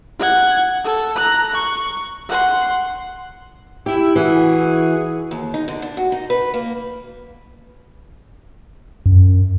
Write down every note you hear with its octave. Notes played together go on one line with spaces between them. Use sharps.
F#5 G#6
A4
A#5 F#6
C#6
F#5 C6
E4 G4
E3 F#4 G#4
D#2
D#4
D3
D4
F#4
D#4
B4
A#3
F#2